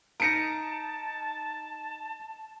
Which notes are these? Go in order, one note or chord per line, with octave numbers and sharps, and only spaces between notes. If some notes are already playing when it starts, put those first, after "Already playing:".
D#4 A#4 A5 A#6 C#7 D7